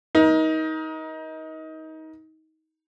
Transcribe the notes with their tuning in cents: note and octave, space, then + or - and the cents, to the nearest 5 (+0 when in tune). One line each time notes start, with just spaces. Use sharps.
D#4 +25 A#4 +40